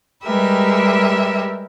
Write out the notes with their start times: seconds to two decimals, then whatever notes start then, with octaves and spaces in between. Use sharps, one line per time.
0.23 G3 G#3 G4 A#4 B4 E5